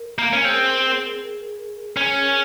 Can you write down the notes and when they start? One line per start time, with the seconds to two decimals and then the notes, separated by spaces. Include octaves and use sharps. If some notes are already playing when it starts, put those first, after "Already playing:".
Already playing: A#4
0.19 A#3
0.33 C#4
0.45 C4 G#4
0.52 A#4
0.61 G#4
1.97 C#4 G#4
2.22 A#4